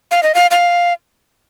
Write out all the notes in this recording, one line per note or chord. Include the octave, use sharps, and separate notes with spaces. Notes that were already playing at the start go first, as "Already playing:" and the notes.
F5
D#5
F5
F5